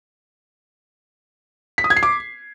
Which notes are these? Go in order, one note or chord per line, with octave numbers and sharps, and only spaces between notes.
B6
D#6
G#6
C7
D6